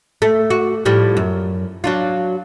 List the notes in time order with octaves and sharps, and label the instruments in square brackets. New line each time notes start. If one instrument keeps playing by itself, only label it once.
[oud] A3
F#4
A2 F3 G3
F#2
F#3 D4 F4